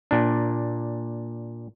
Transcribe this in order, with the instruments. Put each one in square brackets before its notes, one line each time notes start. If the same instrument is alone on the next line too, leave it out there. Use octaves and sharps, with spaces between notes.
[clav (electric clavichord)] A#2 D4